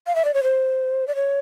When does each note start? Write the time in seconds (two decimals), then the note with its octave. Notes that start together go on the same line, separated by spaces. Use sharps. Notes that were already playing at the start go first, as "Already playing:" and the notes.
0.07 F5
0.15 E5
0.25 D5
0.34 C#5
0.43 C5
1.07 D5
1.15 C#5